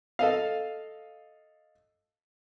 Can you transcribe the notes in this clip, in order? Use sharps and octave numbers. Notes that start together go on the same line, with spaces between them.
A4 D#5 F5